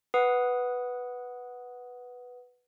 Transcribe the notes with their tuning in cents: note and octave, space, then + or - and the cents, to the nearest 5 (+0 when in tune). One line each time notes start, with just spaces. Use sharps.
B4 +0 F#5 +0 D#6 +0